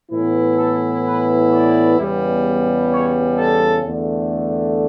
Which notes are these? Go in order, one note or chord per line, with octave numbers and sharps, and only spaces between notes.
A2 E3 B3 E4
A4
B4
D5
E2 C#3 G3 B3
C#5
A4
E2 D3 A3